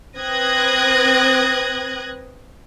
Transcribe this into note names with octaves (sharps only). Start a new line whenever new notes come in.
C4 B4 D#6 F#6 G#6 A#6